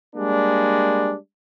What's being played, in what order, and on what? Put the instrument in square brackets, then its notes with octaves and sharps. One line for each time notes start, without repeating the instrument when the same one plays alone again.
[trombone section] G3 G#3 A#3 D4